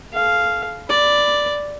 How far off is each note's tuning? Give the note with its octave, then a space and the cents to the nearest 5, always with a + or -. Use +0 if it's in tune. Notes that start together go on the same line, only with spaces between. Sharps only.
A4 -45 F5 -5
D5 +0 B5 +15